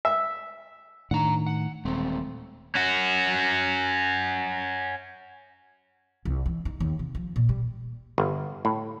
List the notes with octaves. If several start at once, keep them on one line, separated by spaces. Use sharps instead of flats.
E5
A2 D#3 D4 F#5 A#5
F#5
D#1 G#3 A3 C4
C#4 F#4
C2
E3
D#4
D#2
C3
F3
A#2
G3
G1
A2